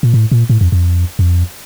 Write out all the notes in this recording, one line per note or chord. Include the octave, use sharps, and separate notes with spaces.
A#2
A2
A#2
A2
F2
F2
F2